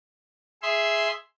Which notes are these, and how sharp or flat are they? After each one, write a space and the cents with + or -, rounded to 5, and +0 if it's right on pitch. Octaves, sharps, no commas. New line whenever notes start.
G#4 +0 E5 +0 C6 +0